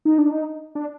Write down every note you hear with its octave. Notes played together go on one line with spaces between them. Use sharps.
D#4
D4
D#4
D4